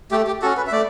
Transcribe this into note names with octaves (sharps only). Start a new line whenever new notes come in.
A3 G4
G4
C#4 F#4 A4
B4
E5
A3 D5